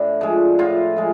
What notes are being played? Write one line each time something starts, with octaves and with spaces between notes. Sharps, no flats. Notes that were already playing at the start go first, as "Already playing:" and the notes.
Already playing: A2 D4
F3 G#3
A2 F4
F3 G#3